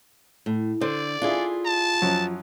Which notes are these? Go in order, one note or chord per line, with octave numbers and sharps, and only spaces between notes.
A2
D3 C5 D5
D4 E4 F4 G#4
A5
F#2 F3 F#3